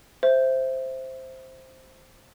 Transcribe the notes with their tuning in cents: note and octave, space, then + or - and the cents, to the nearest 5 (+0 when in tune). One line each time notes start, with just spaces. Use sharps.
C5 +0 E5 +0